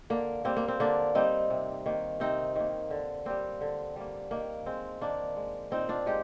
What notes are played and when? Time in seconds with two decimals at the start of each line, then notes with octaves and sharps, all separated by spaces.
0.10 D3 A#3
0.45 G3 A#3 C4
0.57 A#3
0.68 C4
0.80 D3 A#3 D4
1.15 G3 A#3 C4 D#4
1.50 C3
1.86 D#3 A#3
2.20 C3 C4 D#4
2.56 D#3 A#3
2.91 D3
3.26 G3 A#3 C4
3.61 D3
3.96 G3 A#3
4.31 D#3 A#3
4.66 G#3 C4
5.01 D#3 A#3 D4
5.36 G#3
5.71 A#2 C4 D#4
5.89 D4 F4
6.06 G#3 D#4 G4